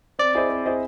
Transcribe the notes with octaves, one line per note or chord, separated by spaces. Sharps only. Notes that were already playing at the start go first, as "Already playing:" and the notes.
C4 D5
E4 G#4 C5 D#5
C4
E4 G#4 C5 D#5